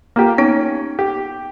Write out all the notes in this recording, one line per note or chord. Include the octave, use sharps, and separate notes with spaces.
A#3 F4 G4
B3 C#4 D#4
G4